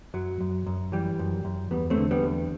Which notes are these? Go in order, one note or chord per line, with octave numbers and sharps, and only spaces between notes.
F#2 F#3
F#2
F#2
E3 G3
F#2
F#2
E2 G3 B3
A3 C4
D3
G3 B3
E2